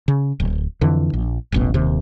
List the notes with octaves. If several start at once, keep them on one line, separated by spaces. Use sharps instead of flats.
C#3
D1
F2 D3 E3
A#1
D#1 A1 B2
D#1 D#2 C3